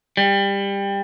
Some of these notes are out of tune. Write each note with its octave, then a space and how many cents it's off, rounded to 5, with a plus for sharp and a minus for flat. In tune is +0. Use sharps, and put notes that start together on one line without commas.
G3 +20